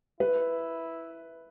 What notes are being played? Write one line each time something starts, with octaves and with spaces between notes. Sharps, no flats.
E4 B4